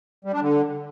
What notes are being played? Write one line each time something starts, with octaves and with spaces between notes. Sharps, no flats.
G3
D4
D3